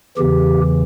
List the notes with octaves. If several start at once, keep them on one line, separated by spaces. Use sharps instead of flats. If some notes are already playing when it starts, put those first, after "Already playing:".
E2 C#3 E3 G4